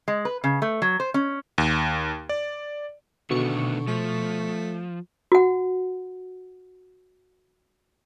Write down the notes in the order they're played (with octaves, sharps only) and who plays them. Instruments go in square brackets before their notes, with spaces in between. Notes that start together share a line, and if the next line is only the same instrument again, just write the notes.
[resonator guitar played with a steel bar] G#3
B4
C#3
A3
F#3
C5
C#4
[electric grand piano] D#2
D5
[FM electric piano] B2 C#6 C#7 [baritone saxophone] D3 [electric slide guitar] D#3 A3 B3
[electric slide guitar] F3 [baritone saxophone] A3
[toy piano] F#4 F#5